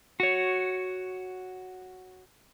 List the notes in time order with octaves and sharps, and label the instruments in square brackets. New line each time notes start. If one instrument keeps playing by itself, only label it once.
[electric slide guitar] F#4 C#5